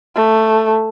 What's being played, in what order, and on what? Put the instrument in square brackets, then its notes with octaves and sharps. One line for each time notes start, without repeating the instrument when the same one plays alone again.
[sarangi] A3